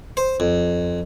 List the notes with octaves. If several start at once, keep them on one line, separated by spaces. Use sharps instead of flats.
C5
F2